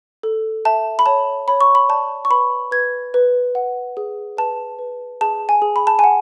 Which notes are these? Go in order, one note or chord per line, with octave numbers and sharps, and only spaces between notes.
A4
E5 A5
B5
C#5 A5
C#5 B5
C#6
B5
D5 A5
C#6
B4 B5
B4 G#6
B4
F#5
G#4
B4 A5
B4
G#4 A5
G#5
G#4
B5
A5
F#5 G#5